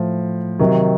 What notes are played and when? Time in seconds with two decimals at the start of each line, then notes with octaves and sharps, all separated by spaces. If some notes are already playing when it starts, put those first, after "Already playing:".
Already playing: A2 F3
0.59 C3 D#3 F#3